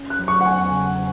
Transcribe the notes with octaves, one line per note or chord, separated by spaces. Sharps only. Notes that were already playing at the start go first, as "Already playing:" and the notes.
Already playing: C#4
F#6
F#3
C#6
F#5
E2 G#5
C#3